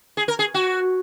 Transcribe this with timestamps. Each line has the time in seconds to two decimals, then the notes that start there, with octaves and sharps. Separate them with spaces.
0.17 G#4
0.28 A#4
0.39 G#4
0.54 F#4